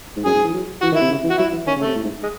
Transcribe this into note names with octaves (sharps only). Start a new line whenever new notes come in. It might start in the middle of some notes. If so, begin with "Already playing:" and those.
G#2
F#2 G#4
G#2
E3
F#3
E3 F#4
D#3
E4
C3
C#3
E3
F#4
F#3 E4
E3
D#3 C#4
C#3
A3
C3
A2
G#2
G#3